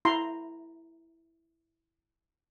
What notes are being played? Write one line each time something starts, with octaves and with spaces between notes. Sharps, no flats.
E4 A#5 C6